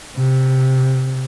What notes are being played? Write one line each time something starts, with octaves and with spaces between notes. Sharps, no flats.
C3